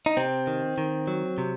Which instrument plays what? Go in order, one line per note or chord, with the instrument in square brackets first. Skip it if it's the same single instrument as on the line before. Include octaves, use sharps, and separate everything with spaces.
[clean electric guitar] D#4
C3 C4
D#3
D#3
F#3
C3